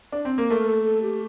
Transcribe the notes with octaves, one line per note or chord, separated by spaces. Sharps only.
D4
C4
A#3
A3 A#4
A4
A4
G4